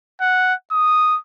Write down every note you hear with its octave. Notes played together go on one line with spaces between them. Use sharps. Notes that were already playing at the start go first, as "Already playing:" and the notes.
F#5
D#6